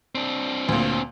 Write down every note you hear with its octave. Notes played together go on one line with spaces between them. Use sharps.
C4 D4
D2 A#2